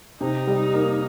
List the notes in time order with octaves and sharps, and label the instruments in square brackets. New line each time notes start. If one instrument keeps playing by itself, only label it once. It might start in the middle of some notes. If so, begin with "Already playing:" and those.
[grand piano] C3 [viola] D#4
[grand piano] G3
A#3